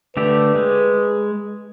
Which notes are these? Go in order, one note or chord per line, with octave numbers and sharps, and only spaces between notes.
D3 A3 G4 B4
G#3